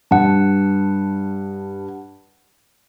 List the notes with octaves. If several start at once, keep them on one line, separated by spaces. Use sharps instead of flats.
G2 F#5 A5